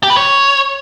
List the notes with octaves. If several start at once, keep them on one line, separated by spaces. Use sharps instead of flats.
G4
B4
C#5